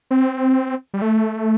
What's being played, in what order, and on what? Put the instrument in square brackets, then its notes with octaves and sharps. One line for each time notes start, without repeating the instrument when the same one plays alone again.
[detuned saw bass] C4
G3
A3